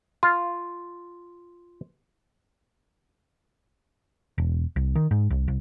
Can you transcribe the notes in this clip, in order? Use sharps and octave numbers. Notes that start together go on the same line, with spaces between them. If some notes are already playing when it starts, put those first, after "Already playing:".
F4 C6
E1
C2
D#3
G#2
C2
C2